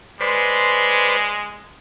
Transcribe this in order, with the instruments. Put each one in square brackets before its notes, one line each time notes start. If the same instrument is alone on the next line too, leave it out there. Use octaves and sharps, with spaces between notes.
[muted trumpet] G#3 [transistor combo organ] B4 C5 D5